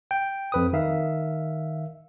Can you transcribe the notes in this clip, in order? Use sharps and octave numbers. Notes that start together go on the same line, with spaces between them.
G5
F2 B4 D#6
D#3 E5 F5